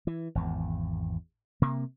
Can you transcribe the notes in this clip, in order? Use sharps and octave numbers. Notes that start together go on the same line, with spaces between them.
E3
G#1 E2
C3 A#3